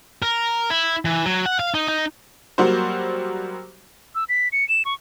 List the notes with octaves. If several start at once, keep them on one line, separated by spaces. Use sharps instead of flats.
A#4
E4
E3
F#3
F#5
F5
D#4
D#4
F#3 G3 A#3 F#4 C5
E6
B6
C#7
E7
C#6